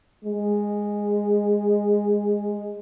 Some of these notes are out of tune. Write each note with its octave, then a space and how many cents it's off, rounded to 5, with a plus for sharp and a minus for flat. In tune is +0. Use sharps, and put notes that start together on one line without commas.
G#3 -10